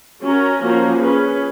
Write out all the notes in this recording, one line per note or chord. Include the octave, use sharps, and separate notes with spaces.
C#4 F#4 A#4
F3 A#3 C#4 F#4 A#4
C#4 G#4 B4